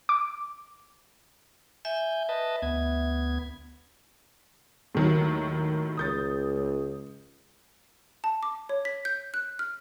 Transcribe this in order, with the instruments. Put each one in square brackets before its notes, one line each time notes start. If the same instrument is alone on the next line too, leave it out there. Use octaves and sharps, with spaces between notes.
[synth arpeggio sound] D6
[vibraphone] E5 [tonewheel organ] G#5 G6
[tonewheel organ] B4 D#5 A5
D2 B3 G#6
[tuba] D#2 [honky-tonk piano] A2 D#3 F#3
[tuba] C#2 [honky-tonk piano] D#6 G6 A6
[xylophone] A5
D6
C#5
B6
G6
F#6
F6